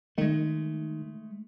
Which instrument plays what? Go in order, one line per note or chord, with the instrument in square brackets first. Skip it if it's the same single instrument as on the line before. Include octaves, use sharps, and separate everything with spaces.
[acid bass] D#3 [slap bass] G#3 A3